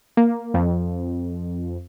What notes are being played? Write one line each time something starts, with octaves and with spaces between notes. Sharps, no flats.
A#3
F2